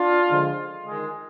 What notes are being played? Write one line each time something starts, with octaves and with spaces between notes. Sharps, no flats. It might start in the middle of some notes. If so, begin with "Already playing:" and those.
Already playing: D4 F4
D3 F3 G#3
D#3 G#3